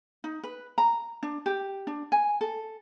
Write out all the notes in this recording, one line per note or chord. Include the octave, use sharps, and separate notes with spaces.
D#4
B4
A#5
D4
G4
D4
G#5
A4